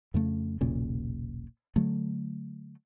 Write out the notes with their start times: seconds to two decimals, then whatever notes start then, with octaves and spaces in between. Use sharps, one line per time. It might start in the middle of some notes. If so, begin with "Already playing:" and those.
0.14 F2 C#3 A3
0.61 E1 B1 A#2 C#3
1.76 D3 F#3 A3